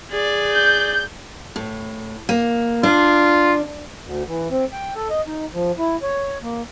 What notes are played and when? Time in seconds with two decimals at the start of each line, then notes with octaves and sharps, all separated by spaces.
0.11 G#4 D5
0.51 G6
1.56 A2
2.29 A#3
2.83 D4 F4
4.05 D2
4.28 E3
4.51 C4
4.72 G5
4.95 A4
5.10 D#5
5.27 D#4
5.54 F3
5.78 E4
6.02 C#5
6.42 A#3